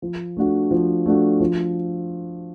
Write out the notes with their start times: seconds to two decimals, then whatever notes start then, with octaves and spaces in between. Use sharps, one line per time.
0.02 F3
0.37 A3 D4 F#4
0.71 F3
1.06 A3 D4 F#4
1.40 F3